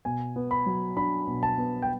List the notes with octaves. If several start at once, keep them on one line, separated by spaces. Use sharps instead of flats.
B2 G#5
B3
B5
F#3
D4 B5
B2
A5
B3
G5